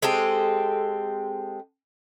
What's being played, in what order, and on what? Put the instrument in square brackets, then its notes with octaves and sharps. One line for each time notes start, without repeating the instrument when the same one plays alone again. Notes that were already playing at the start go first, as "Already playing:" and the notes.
[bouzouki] G#3 C4 G4 A4